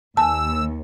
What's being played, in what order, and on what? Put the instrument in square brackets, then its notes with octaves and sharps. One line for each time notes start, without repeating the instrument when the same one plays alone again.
[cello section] D#2 [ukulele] B4 G#5 [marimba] A5 [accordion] E6